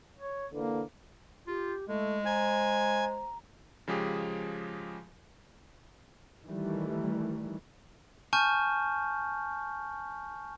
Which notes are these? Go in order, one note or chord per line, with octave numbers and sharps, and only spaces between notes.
C#5
D3 E3 A#3
F4 G4
G#3 A3 E4
C5 G#5 A#5
C#3 F3 G#3 G4 G#4
D#3 E3 G3 A3
G#5 A5 C#6 F6 G6